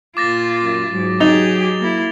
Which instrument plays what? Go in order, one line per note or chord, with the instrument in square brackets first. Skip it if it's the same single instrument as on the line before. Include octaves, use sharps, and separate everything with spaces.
[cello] A#2 F4 [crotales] D6 A6 A#6
[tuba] F#2
[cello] G#2 [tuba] F#3
[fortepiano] D#4 [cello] G4 G#4 [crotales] A6 F7 G7
[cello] A#3 E4